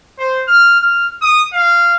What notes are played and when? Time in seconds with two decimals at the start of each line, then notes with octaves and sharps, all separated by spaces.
0.18 C5
0.48 F6
0.80 F6
1.21 D#6
1.53 F5